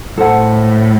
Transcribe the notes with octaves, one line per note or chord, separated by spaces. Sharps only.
A2 A4 C5 F#5 A5